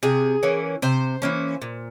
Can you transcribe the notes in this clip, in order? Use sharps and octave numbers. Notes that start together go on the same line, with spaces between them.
C3 G#4
E3 A#3 C#4
C3 C5
E3 A#3 C#4
A#2